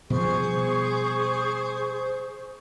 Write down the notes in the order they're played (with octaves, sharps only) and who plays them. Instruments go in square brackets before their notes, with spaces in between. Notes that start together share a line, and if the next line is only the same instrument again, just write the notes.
[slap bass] B2 F3 G3 [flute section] G#4 C#6 [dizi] C5